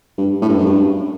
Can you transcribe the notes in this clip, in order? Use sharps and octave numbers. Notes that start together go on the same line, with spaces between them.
G2
A2
G2
F#2
G2